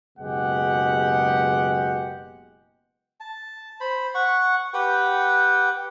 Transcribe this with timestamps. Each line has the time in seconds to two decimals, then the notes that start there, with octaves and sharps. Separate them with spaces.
0.18 F#1 B2 G#3 G4 F#5
3.20 A5
3.80 C5 B5
4.15 F#5 C#6
4.74 G4 B4 F#5 G5